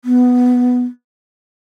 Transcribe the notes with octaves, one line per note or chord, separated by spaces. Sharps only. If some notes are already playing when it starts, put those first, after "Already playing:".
B3